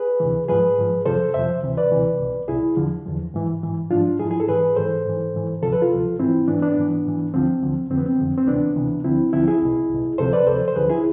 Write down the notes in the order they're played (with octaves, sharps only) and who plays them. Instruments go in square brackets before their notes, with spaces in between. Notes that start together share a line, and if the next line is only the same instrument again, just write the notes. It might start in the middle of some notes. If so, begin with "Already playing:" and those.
Already playing: [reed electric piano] G#4 B4
D2 C3 E3
G#2 F3 G#4 B4
G#2 F3
F2 C3 F3 A4 C5
F2 C3 F3 C5 E5
D2 C3 E3
B4 D5
D2 C3 E3
C2 B2
C2 B2 E4 G#4
E2 D3 F3
E2 D3 F3
G#2 E3
G#2 E3
G#2 F3 D4 F4
G#2 F3 E4 G#4
G#4
A4
G#2 E3 G#4 B4
G#2 E3 A4 C5
G#2 E3
G#2 E3
D2 C3 F3 A4
B4
F4 A4
D2 C3 F3
G#2 E3 C4 E4
G#2 E3 B3 D4
B3 D4
G#2 E3
G#2 E3
D2 D3 F3 C4
D2 D3 F3
F2 D3 F3 C4
B3
C4
F2 D3 F3
C4
D2 C3 E3 B3 D4
D2 C3 E3
D2 D3 F3 C4 E4
D2 D3 F3 C4 E4
E4 G#4
C2 B2
C2 B2
D2 C3 F3 A4 C5
B4 D5
D2 C3 F3 A4 C5
C5
D2 D3 F3 G#4 B4
E4 G#4